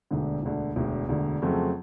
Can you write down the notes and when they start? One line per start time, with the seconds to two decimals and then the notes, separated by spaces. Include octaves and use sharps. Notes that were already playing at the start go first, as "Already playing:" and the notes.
0.11 E1 D2 D3
0.43 E1 D2 D3
0.76 E1 D2 D3
1.09 E1 D2 D3
1.42 F2 C#3 F#3 A3 C4